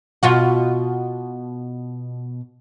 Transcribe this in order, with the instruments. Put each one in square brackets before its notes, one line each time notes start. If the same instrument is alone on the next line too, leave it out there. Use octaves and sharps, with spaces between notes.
[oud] B2 F4 F#4